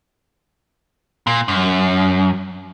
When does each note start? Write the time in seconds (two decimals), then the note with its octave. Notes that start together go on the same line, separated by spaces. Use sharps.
1.27 A#2
1.48 F#2